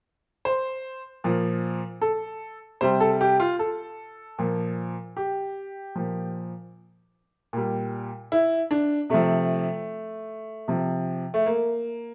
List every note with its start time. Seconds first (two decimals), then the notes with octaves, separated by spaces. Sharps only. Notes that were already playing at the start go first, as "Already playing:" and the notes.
0.45 C5
1.24 A#2 F3
2.02 A4
2.81 C3 G3 C5
3.00 A4
3.21 G4
3.40 F4
3.59 A4
4.39 A#2 F3
5.17 G4
5.96 A#2 F3
7.53 A#2 G3
8.32 E4
8.71 D4
9.10 C3 F3 A3
10.68 C3 F3
11.34 A3
11.46 A#3